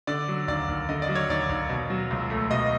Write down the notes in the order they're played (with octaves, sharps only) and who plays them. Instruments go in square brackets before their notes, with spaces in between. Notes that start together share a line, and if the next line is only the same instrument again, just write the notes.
[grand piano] D3 D5
F#3
D#2 D5
D#2
D3 D#5
D5
F#3
C#5
D#2 D5
D#2
B2
F#3
C#2
A3
B2 D#5